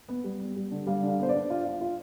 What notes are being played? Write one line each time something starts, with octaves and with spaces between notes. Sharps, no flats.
B3
G3
B3
G3
D3
G3 F5
D3
F5
B3 C5
D5
D4
F4
F4
F4